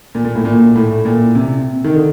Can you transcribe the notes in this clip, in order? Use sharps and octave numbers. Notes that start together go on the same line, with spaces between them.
A#2
A#2
A2
A#2
A2
A#2
C3
D#3
D3